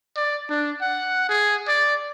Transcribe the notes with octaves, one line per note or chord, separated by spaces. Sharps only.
D5
D4
F#5
G#4
D5